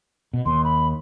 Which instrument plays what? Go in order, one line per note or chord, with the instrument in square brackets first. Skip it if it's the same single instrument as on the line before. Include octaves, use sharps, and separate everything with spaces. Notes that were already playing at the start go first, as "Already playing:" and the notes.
[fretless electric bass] B2
[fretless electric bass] D#2 [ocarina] C6
[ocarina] B5